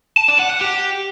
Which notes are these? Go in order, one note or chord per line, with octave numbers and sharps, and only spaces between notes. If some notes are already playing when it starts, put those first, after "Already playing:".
A5
D5
F#5
F#5
G4